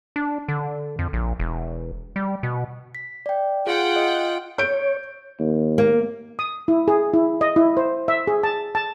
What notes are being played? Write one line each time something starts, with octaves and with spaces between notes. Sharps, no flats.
D4
D3
F2
A#1
E1
G3
B2
B6
D5 G5
F4 G#4 F#5 G5
D#5
C#5 G6 D7
D#2
A#3
D#6
E4
G#4
E4
D#5
E4
C5
E5
G#4
A5
A5